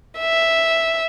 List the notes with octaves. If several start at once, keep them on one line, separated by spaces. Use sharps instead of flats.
E5